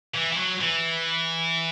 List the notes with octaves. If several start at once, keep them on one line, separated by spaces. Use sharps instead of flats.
E3
E3
F#3
E3